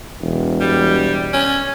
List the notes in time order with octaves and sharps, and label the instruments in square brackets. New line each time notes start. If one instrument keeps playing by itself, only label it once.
[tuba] E1
[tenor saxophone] G3
C#4